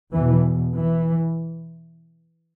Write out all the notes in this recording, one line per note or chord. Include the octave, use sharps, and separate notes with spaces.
E2 B2 E3
E3